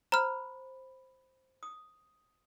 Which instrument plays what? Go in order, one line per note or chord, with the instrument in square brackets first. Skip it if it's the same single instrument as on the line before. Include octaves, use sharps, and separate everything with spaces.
[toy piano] C5 B5 [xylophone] A#5 F6
[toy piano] D#6